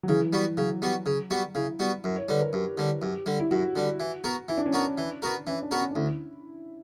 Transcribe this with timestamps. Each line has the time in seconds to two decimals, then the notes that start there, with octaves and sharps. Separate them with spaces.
0.03 F#3
0.08 C#3 E3
0.33 G3 B3 F#4
0.57 C#3 F#3
0.82 G3 B3 F#4
1.06 C#3
1.31 G3 B3 F#4
1.55 C#3 E4
1.79 G3 B3 F#4
2.04 F#2
2.16 C#5
2.28 D3 G3 B4
2.41 A#4
2.53 F#2 G4
2.78 D3 G3
3.02 F#2 G4
3.26 D3 G3
3.39 E4
3.51 F#2 F#4
3.76 D3 G3
4.00 E3
4.24 B3 F#4 A#4
4.49 E3 E4
4.57 D4
4.66 C#4
4.73 B3 D4 F#4 A#4
4.98 E3
5.22 B3 F#4 A#4
5.47 E3 C#4
5.62 D4
5.71 B3 F#4 A#4
5.79 C#4
5.91 D4
5.95 D2 E4